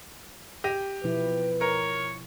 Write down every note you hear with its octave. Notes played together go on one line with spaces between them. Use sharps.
G4 A#6 D#7
B2 F3 E4 B4
A#4 C#5